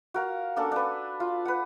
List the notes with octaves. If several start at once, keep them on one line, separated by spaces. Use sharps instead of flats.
F#4 A#4 F5
A#3 C#4 D4 A4
D4 B4
F4
B4 F#5